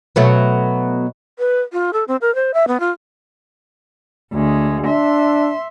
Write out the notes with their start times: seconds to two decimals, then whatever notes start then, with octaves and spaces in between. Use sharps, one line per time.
0.16 B2 F#3 A3
1.39 B4
1.73 F4
1.93 A4
2.08 C4
2.21 A#4
2.35 C5
2.54 E5
2.68 B3
2.80 F4
4.33 D2 G#3
4.86 D4 E5 C6